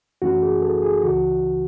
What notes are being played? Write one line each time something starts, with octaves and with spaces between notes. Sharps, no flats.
F#2 E3 A3 C#4 F#4
G#4
A4
G#4
C#2 C#3 E3 F#4